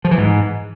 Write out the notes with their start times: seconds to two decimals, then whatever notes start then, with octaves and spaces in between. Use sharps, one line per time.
0.05 F3
0.11 E3
0.18 G#2